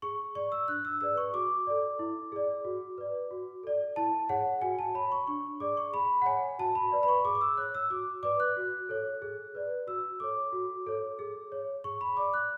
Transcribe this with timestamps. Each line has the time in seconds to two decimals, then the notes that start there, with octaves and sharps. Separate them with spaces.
0.02 G#4 C#6
0.35 D5 C#6
0.52 E6
0.68 D4 F#6
0.85 E6
1.01 G#4 B4 D5 E6
1.17 C#6
1.33 F#4 D6
1.67 A4 D5
1.99 E4
2.32 G#4 D5
2.65 F#4
2.98 B4 D5
3.31 F#4
3.63 A4 D5
3.96 E4 A5
4.29 G#4 C#5 F#5
4.62 F#4 G#5
4.79 A5
4.94 C#5 B5
5.12 C#6
5.27 D4 C#6
5.60 G#4 D5 D6
5.77 C#6
5.93 G#4 B5
6.22 F#5
6.26 C#5 G#5
6.59 F#4 A5
6.75 B5
6.92 B4 D5
7.03 B5
7.08 C#6
7.25 G#4 D6
7.35 D6
7.41 E6
7.58 C#5 F#6
7.75 E6
7.90 F#4 D6
8.23 B4 D5 D6
8.40 F#6
8.57 F#4
8.89 A4 C#5
9.22 G#4
9.55 B4 D5
9.87 F#4 E6
10.20 A4 C#5 D6
10.53 F#4
10.86 A4 C#5
11.19 G#4
11.52 C#5
11.84 G#4 C#6
12.01 B5
12.17 D5 D6
12.34 F#6